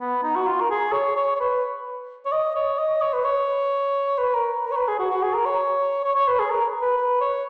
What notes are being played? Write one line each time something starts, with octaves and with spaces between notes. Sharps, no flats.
B3
D#4
F#4
F4
A#4
G#4
C#5
C#5
C#5
B4
C#5
D#5
C#5
D#5
C#5
B4
C#5
B4
A#4
A#4
C#5
B4
G#4
F#4
F#4
G#4
A#4
C#5
C#5
C#5
B4
G#4
A#4
B4
B4
C#5